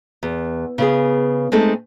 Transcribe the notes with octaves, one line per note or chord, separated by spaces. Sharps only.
E2
C#3 B3 G#4
G#3 A3 C4 D#4 A4